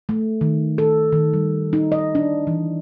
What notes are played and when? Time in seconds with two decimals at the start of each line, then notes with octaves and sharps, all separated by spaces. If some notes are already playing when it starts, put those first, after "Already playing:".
0.09 A3
0.41 D#3
0.78 A4
1.13 D#3
1.33 G3
1.73 D#4
1.92 D#5
2.15 D4
2.47 E3